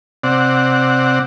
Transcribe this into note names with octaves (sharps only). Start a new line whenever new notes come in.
C3 C4 D5 F#5